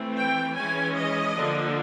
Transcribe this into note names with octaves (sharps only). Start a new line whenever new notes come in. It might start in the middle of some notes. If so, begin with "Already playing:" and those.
Already playing: E3 A3 C4
G5
E3 G#3 C#4 G#5
D#5
D3 F3 A#3 D4